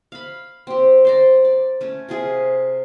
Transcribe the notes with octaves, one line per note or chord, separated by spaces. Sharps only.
F5 B5
C4 G4
C5 D5 A#5
D5
A3 C#4
C3 F4 G#4